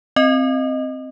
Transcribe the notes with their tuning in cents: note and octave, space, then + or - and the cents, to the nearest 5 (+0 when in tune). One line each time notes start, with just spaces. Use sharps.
C4 +0 D#5 +0